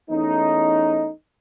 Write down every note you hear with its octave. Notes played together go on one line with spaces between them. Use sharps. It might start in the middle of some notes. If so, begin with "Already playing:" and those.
E2 A3 C#4 D#4